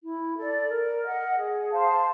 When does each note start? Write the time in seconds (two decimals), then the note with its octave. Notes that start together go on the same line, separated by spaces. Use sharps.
0.03 E4
0.36 A4 D5
0.69 A#4
1.03 D#5 F#5
1.36 G#4
1.70 C5 F5 A5